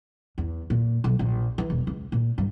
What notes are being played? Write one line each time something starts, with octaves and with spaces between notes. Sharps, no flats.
E2
A#2
B1
A#1
E3
E1
C#2
A#2
G2